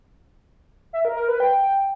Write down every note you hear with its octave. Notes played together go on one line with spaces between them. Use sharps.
E5
A#4
A#4
B4
G5